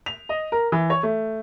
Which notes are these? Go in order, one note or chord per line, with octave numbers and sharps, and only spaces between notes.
F7
D#5
A#4
E3
C#5
A3